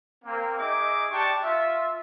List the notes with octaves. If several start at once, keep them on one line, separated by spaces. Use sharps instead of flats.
A#3 C4
D#4 G#4 D#5 E5 D6
D4 G4 G5 A5 C6 C#6
F4 E5